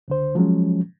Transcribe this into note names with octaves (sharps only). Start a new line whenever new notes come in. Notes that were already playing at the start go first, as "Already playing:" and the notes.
C#2 D3 C5
F3 F#3 G#3 C#4